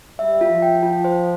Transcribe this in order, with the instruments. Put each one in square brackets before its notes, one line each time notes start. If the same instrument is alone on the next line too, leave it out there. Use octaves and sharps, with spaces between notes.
[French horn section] G3 [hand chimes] E5
[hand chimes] F4
[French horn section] F3
[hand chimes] G5
F4
C5